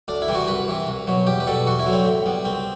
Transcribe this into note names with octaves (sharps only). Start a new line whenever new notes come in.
D2 D4
E4
C3 E3 G3
F#4
C2 B4
C3 E3
C2
B2 F#3
E2 G4
B4
B2 G3 A4
E2 F#4
E4
D3 F#3
C4
A2
G3 B3
C2 C4